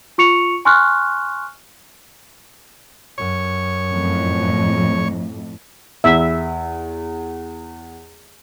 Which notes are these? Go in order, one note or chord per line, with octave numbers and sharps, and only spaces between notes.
F4 C#6 C#7 F7
G#5 C6 C#6 F6 F#6
F#2 C#5
F2 A2
E2 E5